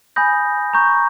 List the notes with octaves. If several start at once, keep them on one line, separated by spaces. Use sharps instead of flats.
G#5 B5 D#6 G6 A#6
A#5 C#6 G6